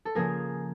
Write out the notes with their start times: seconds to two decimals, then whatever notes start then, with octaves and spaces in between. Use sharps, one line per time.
0.05 A4
0.15 C#3 F3 A#3 G#4 A#4